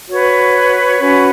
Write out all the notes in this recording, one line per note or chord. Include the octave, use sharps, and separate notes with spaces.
F#4 B4 C#5
C#4 F#4 B4